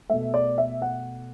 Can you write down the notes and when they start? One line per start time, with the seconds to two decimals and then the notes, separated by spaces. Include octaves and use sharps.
0.10 B2 A3 E5
0.34 D5
0.58 E5
0.82 F#5